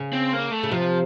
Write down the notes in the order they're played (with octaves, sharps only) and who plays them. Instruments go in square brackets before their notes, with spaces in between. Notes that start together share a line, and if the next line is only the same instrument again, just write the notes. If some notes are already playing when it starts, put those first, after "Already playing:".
Already playing: [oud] C#3
[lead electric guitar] C4
A#3
A3
[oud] C#3
[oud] C3 [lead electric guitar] F3